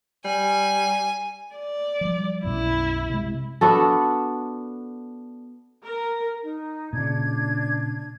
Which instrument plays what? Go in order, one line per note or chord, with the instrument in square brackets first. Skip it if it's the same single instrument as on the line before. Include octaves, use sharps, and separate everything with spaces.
[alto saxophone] G3 [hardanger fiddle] G#5
[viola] D5
[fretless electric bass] F3 G3
[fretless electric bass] B1 F#2 B2 [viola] E4
[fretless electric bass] C3 G#3
[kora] B3 D4 F#4 A4
[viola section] A#4
[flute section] D#4
[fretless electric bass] A#2 C#3 [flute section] D4 G#6